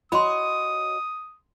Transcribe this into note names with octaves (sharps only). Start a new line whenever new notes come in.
F#4 C#5 D#5 B5 C6 D#6